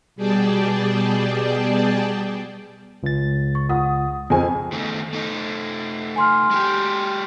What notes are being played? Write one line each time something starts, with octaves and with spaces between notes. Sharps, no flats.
B2 G3 G#4 D5 G5 A5
C#2 A6
C#6
F4 F#5 D#6
F2 F4 G#4 C5 G#5
D#3 A3
A3 D#4
G#5 C6 F6
G#3 G4